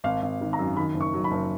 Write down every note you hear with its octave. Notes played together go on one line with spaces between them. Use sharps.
G#1 F5
G#1
D#3
A#5
F#2
D#3 B5
F#1
C#6
F#3
B5
F#1